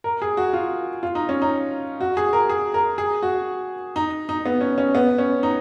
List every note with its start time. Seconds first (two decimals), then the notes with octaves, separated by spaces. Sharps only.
0.04 A#4
0.22 G#4
0.37 F#4
0.53 F4
1.03 F4
1.15 D#4
1.29 C#4
1.42 D#4
2.01 F#4
2.17 G#4
2.33 A#4
2.49 G#4
2.74 A#4
2.98 G#4
3.23 F#4
3.96 D#4
4.29 D#4
4.45 B3
4.61 C#4
4.78 C#4
4.95 B3
5.18 C#4
5.43 D#4